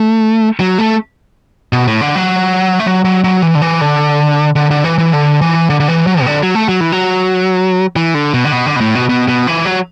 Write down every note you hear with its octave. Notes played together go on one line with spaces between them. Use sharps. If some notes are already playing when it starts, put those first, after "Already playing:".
Already playing: A3
F#3
A3
B2
A2
D3
F#3
A3
F#3
F#3
F#3
E3
D3
E3
D3
D3
D3
E3
E3
D3
E3
D3
D3
E3
F#3
B2
D3
F#3
A3
F#3
E3
F#3
E3
D3
B2
D3
B2
D3
B2
A2
B2
B2
B2
E3
F#3